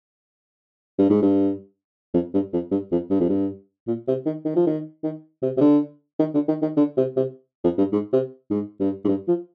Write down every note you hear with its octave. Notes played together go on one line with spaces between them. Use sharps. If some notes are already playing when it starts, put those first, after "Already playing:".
G2
G#2
G2
F2
G2
F2
G2
F2
G2
F2
G2
A#2
C3
D#3
D#3
F3
D#3
D#3
C3
C3
D3
D#3
D3
D#3
D#3
D3
C3
C3
F2
G2
G#2
C3
G#2
G2
G#2
G2
F3